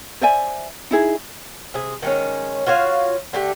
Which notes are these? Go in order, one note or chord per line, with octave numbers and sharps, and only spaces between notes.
C5 D5 E5 G#5
D#4 E4 G#4
C3 G#4
D#3 G#3 C#4
F4 F#4 C#5 F5
D3 A3 G4